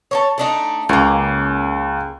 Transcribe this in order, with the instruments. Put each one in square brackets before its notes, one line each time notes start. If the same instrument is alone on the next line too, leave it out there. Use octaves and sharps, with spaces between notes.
[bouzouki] A4 A#4 C#5
A3 D4 D#4
[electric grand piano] C#2 [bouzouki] C#3 A#3